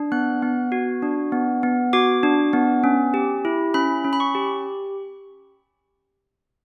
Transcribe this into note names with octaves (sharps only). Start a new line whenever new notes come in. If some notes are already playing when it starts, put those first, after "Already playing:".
Already playing: D4
B3 F#6
B3
F#4
D4
B3
B3
F#4 D6
D4
B3
C#4
G4
E4
C#4 B5
C#4
B5
C#6
G4